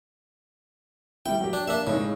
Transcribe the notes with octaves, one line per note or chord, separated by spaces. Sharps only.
G3 E4 G5
F#3 G4
D4
A#3 D4 E5
A2 C#3 G#3 D#4